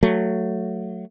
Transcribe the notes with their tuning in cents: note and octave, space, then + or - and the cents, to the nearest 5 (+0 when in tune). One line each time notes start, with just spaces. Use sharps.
F#3 +0 A3 +10